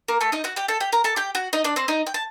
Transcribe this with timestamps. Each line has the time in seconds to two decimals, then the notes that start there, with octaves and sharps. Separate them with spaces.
0.08 A#3 A#4
0.21 A3 A4
0.32 D#4 D#5
0.44 F#4 F#5
0.56 G4 G5
0.68 A4 A5
0.80 G4 G5
0.92 A#4 A#5
1.04 A4 A5
1.16 G4 G5
1.35 F#4 F#5
1.53 D#4 D#5
1.64 D4 D5
1.76 C4 C5
1.88 D#4 D#5
2.07 G5
2.14 A5